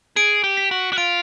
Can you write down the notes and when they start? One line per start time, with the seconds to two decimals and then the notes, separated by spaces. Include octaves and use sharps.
0.16 G#4 D7
0.44 G4
0.57 B6
0.71 F#4
0.93 F#4
0.98 F4 D7